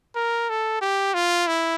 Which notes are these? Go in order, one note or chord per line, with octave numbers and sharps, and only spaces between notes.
A#4
A4
G4
F4
E4